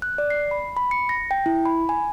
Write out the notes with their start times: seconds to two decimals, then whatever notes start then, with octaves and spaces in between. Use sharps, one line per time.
0.02 F#6
0.18 D5
0.30 C7
0.51 B5
0.77 B5
0.91 C#7
1.09 A#6
1.31 G5
1.46 E4
1.65 B5
1.89 G#5